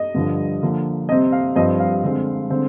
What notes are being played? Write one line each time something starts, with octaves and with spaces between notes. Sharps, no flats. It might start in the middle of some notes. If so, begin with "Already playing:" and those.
Already playing: D#5
G2 D3 F3
D3 F3 A#3
C3 G3 C4 D#5
F5
G2 F3 C4 D#5
F5
D3 G#3 C4
D3 G#3 C4